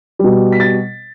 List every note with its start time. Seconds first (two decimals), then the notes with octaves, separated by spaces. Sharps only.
0.19 B2 G3
0.52 B6
0.60 A6